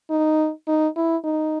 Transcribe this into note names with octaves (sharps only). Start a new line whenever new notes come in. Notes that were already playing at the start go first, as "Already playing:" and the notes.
D#4
D#4
E4
D#4